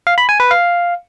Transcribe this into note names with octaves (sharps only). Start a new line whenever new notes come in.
F5
B5
G#5
B4
F5